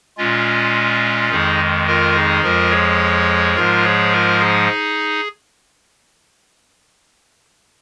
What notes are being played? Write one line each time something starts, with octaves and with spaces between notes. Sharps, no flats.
A#2 G#3 C#4 F4
F2 D#3 G#3 D#4 G#4
F4 A#4
D#4 G#4
F2 F3 G#3 F4 A#4
G#4 C#5
G#2 F3 G#3 F4 A#4
G#4 C#5
F4 A#4
D#4 G#4